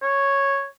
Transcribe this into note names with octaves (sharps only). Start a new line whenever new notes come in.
C#5